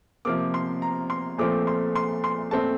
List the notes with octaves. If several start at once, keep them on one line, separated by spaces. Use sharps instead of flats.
C3 F3 A#3 D6
C6
A#5
C6
A#2 F3 A3 C4 D6
C6
C6
C6
A#2 A3 C4 A5